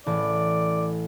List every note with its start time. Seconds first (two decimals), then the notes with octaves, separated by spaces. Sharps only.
0.06 A1 D5